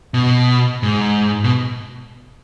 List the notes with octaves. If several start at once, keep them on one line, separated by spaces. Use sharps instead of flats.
B2
G#2
B2